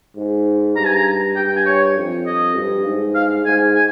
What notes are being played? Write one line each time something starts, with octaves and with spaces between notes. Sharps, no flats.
G#2
G2 A#5
G#5
A#5
G2 G5
G5
G#5
C#5
F2
D#5
G2
G#2
F5
G#2 G#5
G#5